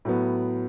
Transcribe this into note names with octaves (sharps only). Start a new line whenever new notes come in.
A2 F#3 B3